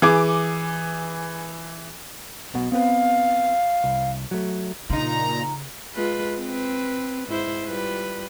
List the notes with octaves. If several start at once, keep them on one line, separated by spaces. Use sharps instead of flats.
E3 G#4 D6
B1 B2 F#5
B3 C4 B4 F5
C2
F#3 A3
A#2 C#3 F3 D#4 A#5
G#3 F4 B4
C4 B4
G#2 E4 C5
G3 F4 B4